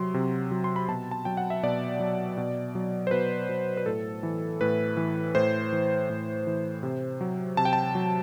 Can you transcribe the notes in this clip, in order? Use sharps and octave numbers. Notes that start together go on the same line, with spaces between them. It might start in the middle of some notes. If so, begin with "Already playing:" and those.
Already playing: C3 F#3 C6
C3
F#3
C6
B5
B2 A5
A5
F#3 G5
F#5
E5
B2 D5
F#3
B2
F#3
C5
B2 B4
F#3
B4
A2 A4
E3
A2 B4
E3
A2 C5
E3
A2
E3
C3
F#3
C3 A5
G5
A5
F#3